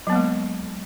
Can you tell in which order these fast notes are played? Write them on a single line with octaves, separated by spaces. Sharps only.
F#3 B3 A#3 G#3